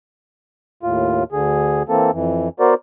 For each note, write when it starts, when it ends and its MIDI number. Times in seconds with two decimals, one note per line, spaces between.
0.83 1.24 39
0.83 1.24 45
0.83 1.24 65
1.32 1.83 38
1.32 1.83 50
1.32 1.83 68
1.89 2.11 52
1.89 2.11 58
1.89 2.11 60
1.89 2.11 69
2.13 2.49 41
2.13 2.49 52
2.60 2.74 59
2.60 2.74 66
2.60 2.74 70
2.60 2.74 72
2.60 2.74 74